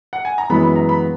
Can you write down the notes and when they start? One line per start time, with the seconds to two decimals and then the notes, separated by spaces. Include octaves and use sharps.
0.13 F#5
0.25 G#5
0.38 A#5
0.50 F#2 E3 G#3 B3 B5
0.63 B5
0.76 A#5
0.89 B5